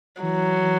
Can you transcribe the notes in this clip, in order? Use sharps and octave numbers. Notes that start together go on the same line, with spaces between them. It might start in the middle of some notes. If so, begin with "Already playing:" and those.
E3 F#3
E3